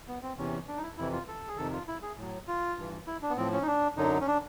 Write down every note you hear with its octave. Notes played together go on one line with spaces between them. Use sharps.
B3
C4
E2 C3 E3 C#4
D4
D#4
E4
F2 C3 E3 E4
F4
A4
G#4
F2 C3 D#3 A4
F4
E4
G#4
A2 F#3
F4
G2 E3
E4
D4
B3
A2 F3 C4
C#4
D#4
D4
F#2 D3 F#3 D#4
C#4
D4